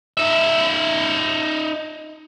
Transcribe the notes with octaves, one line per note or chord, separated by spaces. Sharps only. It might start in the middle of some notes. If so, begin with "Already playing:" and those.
D#4 E5